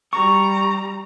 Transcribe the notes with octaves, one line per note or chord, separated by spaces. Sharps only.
G3 A#5 C#6